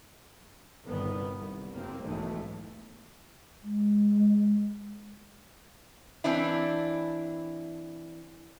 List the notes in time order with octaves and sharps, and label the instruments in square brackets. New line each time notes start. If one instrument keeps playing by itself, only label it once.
[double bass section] G1 C2 A#2 D#3 B3
G1 C2
F#1 A#3 C4
B1 F2 G#2 E3 G#3 A3
[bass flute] G#3
[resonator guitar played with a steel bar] E3 C4 D4 E4